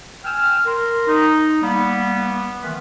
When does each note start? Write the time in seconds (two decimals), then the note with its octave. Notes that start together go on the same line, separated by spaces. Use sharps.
0.24 G5 G#5 E6 F6
0.66 A#4 C6
1.07 D#4
1.62 G3 A#3 B3
2.62 D#3 E3 A3 B3 F4 B4